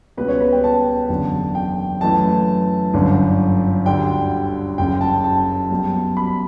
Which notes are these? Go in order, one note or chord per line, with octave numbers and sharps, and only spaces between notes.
C#2 B2 G3 C#4 B4
C#5
B4
G5
A5
F#1 E2 D3
G5
F#2 E3 A3 A5
G1 F#2 D3
D2 D3 G3 G5
F#1 F#2 C#3 G5
A5
A5
B1 B2 G3
B5